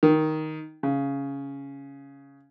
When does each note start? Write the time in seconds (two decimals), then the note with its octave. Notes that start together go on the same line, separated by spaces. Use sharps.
0.03 D#3
0.83 C#3